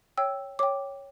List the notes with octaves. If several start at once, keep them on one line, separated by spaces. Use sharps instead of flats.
C#5 G5 E6
C#5 G5 D6